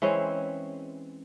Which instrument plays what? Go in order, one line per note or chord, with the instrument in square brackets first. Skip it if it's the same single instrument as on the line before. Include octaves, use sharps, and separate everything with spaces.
[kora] E3 G#3 C4 C#4